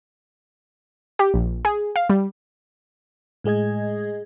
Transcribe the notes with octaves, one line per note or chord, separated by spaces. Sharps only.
G4
A#1
G#4
F5
G3
A2 G#3 G#4 D#5 G#6